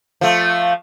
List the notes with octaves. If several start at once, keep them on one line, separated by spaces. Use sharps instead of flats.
F3 A3